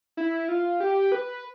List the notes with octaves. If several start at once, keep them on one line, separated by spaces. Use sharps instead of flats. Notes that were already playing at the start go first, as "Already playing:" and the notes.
E4
F4
G4
B4